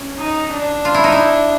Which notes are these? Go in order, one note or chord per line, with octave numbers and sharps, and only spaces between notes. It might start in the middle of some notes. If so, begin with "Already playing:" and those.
Already playing: C#4
D#4
D4
F4
E4
D#4
E4